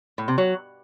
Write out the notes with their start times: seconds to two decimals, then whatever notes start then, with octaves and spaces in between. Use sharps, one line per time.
0.18 A2
0.28 C3
0.38 F#3